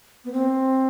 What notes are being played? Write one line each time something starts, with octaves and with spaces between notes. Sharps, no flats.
B3
C4